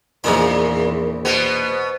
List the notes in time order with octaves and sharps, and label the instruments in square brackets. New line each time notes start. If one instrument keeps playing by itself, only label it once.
[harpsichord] A#1 D#4 B5 [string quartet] E2 [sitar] A#2 [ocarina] A#4
[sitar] B2 B3 [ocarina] C5